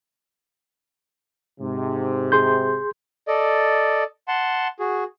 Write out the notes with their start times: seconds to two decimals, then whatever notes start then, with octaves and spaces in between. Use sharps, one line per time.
1.61 G#2 C3
2.32 G#4 C6 G6
3.27 A4 D5 D#5
4.28 F#5 A5 C6
4.79 F#4 G#4